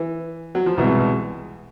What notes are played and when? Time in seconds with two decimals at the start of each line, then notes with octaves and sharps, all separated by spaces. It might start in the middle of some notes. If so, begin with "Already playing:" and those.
Already playing: E3
0.55 F#3
0.66 F3
0.77 C2 B2 E3 G#3